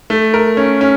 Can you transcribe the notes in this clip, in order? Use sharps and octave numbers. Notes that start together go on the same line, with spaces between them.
A3
A#4
C#4
C#4